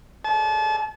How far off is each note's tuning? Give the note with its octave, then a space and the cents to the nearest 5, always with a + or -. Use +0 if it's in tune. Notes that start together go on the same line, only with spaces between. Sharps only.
A5 -35